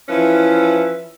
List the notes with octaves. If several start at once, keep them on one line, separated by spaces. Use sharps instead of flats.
E3 F3 C#4 E4 B4